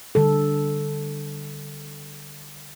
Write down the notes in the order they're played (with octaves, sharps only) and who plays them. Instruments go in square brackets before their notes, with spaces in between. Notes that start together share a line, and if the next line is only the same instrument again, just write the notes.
[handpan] D3 G3 A4